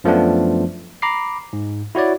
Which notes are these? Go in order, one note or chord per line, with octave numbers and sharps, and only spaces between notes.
F#2 F3 A3 B3 D4
A#5 B5 D6 C7
G#2
E4 F#4 C#5 D5